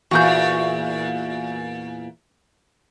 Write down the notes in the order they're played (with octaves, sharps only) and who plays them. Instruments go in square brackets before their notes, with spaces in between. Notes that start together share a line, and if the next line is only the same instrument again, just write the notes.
[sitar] E2 A#2 [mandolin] F#4 G6